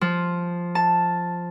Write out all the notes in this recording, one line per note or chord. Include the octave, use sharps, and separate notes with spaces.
F3
A5